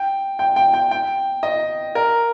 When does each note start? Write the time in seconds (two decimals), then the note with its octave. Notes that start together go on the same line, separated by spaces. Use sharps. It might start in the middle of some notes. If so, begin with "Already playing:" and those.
Already playing: G5
0.39 G5
0.56 G5
0.74 G5
0.91 G5
1.43 D#5
1.95 A#4